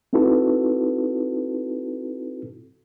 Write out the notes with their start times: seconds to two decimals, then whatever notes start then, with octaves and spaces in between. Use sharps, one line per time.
0.13 C4 D#4 E4 F#4 A4 B4